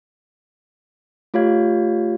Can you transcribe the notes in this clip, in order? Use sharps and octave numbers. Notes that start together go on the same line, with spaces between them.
A3 F4 G4 C#5 F5 G#6